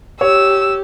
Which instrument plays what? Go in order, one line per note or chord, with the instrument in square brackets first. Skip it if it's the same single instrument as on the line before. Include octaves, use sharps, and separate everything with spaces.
[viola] G4 [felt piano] C#5 [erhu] E6